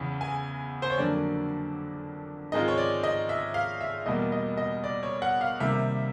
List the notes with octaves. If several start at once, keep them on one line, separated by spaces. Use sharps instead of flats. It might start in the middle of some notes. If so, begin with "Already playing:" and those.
Already playing: E2 C#3 E3
G#5
C5
C#5
F2 D3 F#3 A#3 D5
G#2 D#3 G#3 C4 F4 D#5
C#5
D5
D#5
E5
F5
E5
E2 B2 G3 A#3 D#5
D#5
D#5
D5
C#5
F#5
F5
C3 D#3 G3 A#3 E5